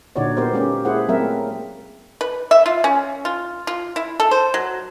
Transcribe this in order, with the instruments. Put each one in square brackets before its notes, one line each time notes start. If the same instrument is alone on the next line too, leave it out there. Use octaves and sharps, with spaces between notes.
[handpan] A#2 D3 D#4 F#4 C#5 D5
B3 G4 A#4 C5
G#3 A#3 C#4 G4
E4 G#4 C5 F#5
F#3 A3 A#3 C4 A#4 E5
[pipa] B4
E5
F4
C#4
F4
F4
E4
A4
C5
F#3